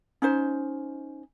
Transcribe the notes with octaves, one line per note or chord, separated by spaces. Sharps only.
C#4 D#4 C5